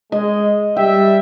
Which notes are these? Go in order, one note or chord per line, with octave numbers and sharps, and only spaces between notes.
G#3 D#5
G3 E5 G5